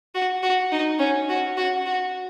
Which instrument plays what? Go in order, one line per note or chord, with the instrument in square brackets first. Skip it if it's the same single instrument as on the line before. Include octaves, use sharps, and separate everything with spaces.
[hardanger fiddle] F#4
F#4
D#4
C#4
F#4
F#4
F#4